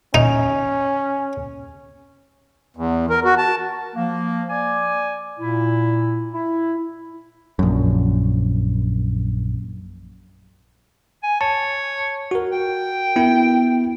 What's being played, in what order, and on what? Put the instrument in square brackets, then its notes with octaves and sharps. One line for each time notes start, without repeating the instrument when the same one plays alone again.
[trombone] C#4 [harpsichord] D#4
[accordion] E2
A#4
F#4
A5
[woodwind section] F3 A#3
D5 G#5
A#2 E4
E4
[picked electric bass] A#1 F#2
[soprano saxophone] G#5
[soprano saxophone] C#5 [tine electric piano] A5
[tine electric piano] F#4 A#4
[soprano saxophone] G5
[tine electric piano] B3 E4